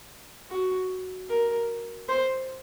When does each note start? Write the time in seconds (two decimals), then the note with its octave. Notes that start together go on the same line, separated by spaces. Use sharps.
0.50 F#4
1.29 A#4
2.09 C5